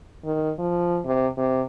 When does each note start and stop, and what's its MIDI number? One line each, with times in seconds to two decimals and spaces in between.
0.25 0.51 51
0.59 0.99 53
1.05 1.27 48
1.37 1.62 48